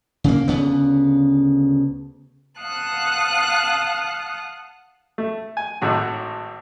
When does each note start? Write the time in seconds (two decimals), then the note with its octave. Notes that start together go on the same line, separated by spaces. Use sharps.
0.24 C#3 A#3
0.48 D2 C#3 B3
2.59 F5 F#5 A5 D#6 F#6
5.18 A3
5.57 G#5
5.82 G#1 A2 F#3 F#4